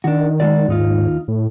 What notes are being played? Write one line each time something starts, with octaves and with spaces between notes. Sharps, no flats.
D#3 D4 F#4
G#3 F#4 D5
D#2 G#2 D#4 F4
A2